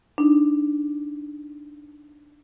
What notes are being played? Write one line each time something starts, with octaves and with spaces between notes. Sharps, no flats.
D4 D#4